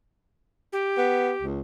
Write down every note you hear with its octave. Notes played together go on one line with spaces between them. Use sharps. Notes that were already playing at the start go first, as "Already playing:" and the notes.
G4
B3
C#2